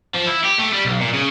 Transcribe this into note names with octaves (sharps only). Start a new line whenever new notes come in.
F3
E4
G4
A3
G3
B1
A#2
C#3